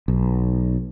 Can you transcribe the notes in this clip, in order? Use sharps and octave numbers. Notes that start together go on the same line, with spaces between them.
B1